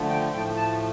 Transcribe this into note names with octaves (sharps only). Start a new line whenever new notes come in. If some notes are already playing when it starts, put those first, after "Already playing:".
Already playing: D3 F3 A3
G5
A2 F3 A3 G5
A5